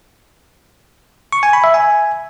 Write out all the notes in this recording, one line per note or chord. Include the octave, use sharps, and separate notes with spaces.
C#6
G#5
B5
E5
G#5